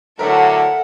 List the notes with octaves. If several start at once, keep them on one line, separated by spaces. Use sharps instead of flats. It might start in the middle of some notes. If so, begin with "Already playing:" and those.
A2 D3 F#3 A4 A#4 E5 F#5